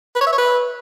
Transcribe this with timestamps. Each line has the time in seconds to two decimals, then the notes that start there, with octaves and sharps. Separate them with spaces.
0.15 B4
0.21 C#5
0.27 E5
0.33 C#5
0.38 B4